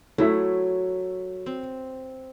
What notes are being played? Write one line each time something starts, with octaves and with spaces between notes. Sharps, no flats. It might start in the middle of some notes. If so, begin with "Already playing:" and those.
F#3 A3 E4 E5
C4